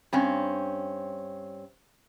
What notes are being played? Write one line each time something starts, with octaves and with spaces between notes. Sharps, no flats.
G2 C4 C#4